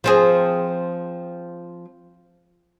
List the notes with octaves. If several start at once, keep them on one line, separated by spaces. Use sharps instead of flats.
F3 C4 G#4